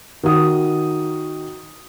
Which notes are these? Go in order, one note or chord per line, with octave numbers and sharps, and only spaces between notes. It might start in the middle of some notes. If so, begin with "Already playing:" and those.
D#3 F#4 D#6